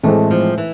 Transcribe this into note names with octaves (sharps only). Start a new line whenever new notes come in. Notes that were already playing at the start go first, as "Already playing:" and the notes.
A2 E3 G#3 A3 C4
F3
E3